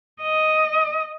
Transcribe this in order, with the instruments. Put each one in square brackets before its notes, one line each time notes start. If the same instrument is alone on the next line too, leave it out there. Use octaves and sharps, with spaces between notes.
[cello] D#5